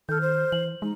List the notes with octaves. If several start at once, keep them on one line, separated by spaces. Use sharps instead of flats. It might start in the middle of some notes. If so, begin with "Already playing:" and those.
D#3 A4 F6 G6
C5
E3 F#7
G#3 D#4